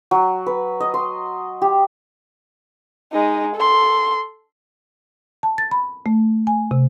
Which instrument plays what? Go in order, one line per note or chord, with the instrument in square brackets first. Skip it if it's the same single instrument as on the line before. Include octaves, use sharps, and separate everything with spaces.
[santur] F#3
B4
D#5
C6
G4
[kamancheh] G#3 D#4
A4 C6
[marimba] A5
A6
B5
A3
G#5
C3